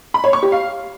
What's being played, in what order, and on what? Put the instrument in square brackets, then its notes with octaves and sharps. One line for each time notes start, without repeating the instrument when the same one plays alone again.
[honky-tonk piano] B5
C#5
C#6
G4
F5